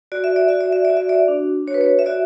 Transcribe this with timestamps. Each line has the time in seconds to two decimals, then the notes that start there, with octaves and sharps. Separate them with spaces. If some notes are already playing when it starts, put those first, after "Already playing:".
0.12 F#4 D5
0.24 E5
0.36 D5
0.48 F#4 E5
0.61 D5
0.72 E5
0.85 D5
0.90 F#4
0.97 E5
1.09 D5
1.28 D4
1.67 F#4 C#5
1.74 B4
1.81 C#5
1.99 E5
2.06 F#4 D5